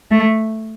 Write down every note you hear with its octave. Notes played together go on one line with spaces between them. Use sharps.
A3